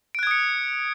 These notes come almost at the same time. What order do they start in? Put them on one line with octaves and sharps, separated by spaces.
D7 F#6 G#6 D#6 C#7